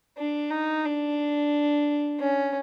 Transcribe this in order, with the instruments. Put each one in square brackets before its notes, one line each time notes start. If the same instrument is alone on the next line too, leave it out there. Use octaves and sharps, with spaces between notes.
[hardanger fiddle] D4
D#4
D4
C#4